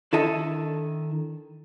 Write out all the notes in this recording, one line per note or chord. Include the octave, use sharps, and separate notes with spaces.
D#3 D4 E4 A4 D#5 A5